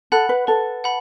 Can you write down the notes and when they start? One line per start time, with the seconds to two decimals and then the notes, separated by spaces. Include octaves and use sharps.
0.12 A4 F#5 B5 F#6
0.29 B4
0.47 A4 B4
0.84 F#5 B5